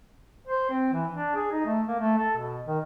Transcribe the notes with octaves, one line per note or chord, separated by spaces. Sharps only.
C5
C4
E3
D4
G#4
D#4
A3
A#3
A3
A4
B2
D#3